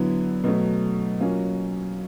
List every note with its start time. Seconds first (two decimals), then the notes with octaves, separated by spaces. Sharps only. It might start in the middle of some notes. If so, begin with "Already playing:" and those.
Already playing: D3 F#3 B3 E4
0.44 B2 F#3 A3
1.20 F#3 A#3 C#4 F4